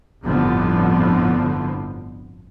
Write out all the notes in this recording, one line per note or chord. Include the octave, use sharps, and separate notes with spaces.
G1 F2 A2 D3 F3 B3